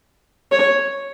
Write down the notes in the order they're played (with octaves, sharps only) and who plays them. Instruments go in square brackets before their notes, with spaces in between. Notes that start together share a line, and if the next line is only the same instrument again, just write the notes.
[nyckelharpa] C#5